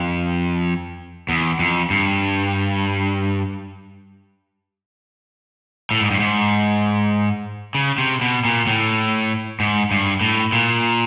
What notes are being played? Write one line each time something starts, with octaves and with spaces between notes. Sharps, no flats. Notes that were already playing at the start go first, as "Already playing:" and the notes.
Already playing: F2
E2
F2
G2
A2
G#2
G2
G#2
C#3
C3
B2
A#2
A2
G#2
G2
A2
A#2